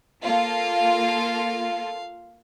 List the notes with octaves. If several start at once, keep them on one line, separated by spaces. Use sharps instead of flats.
A#3 F4 A4 F5